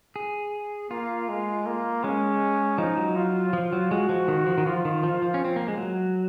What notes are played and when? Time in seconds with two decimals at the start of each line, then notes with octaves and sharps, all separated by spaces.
0.16 G#4
0.91 A#3 F4
1.28 G#3
1.66 A#3
2.04 G#3 C#4
2.78 F3 D#4
2.97 F#3
3.16 F4
3.53 F3
3.73 F#3
3.91 G#3 F#4
4.09 F3
4.28 D#3
4.47 F3
4.58 D#3
4.66 F3 F4
4.85 D#3
5.03 F3
5.22 F3
5.34 C#4
5.45 C4
5.56 A#3
5.68 G#3
5.78 F#3